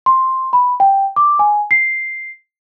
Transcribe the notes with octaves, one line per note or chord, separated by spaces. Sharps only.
C6
B5
G5
D6
G#5
C7